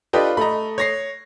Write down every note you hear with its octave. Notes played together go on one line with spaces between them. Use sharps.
D4 F4 G4 A4 B4 D#5
A3 D#5 A#5 B5
C#5 A#6 C7